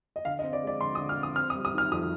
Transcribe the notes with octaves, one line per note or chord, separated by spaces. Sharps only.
D#5
D3 F5
D#5
C4
D5
G#3 D5
D3 C6
D#6
D3
F6
C4
D#6
C4 F6
D#6
G3
D#6
D#3 F6
F2 D#6